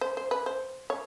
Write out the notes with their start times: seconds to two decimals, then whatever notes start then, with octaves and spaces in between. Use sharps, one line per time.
0.01 C5
0.17 C5
0.31 B4
0.46 C5
0.90 C#5